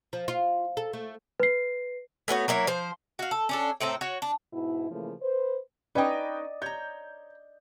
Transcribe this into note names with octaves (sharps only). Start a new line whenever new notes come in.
F3
F4
A4
A3
B4 C7
A3 B3 F#4 C#5
F#3 A#3 E4 C#5
F3 C5
F#4 F5
A4
C#4 D4 A4
A2 C4 A4 A#5
F#4 C#5
D4
G#2 B2 E4
C#3 E3 F3 A3 A#3
B4 C5
C#4 D#4 B4 D5 D#5 G5
C#5 A#5 G6